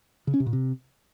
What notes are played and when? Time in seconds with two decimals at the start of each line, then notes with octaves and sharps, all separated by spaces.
0.27 C#3
0.34 C#4
0.40 C3
0.46 A#2
0.53 C3